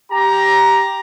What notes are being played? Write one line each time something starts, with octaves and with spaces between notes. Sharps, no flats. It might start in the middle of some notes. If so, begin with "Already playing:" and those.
G4 A#5